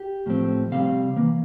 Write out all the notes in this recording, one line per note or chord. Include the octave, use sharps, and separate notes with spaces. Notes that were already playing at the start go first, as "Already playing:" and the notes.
Already playing: G4
A2 F3 A3 C4
C3 G3 C4 F5
E3 A#3